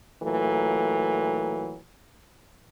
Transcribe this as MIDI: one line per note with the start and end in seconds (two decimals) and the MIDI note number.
0.23 1.78 46
0.23 1.78 52
0.23 1.78 54
0.23 1.78 57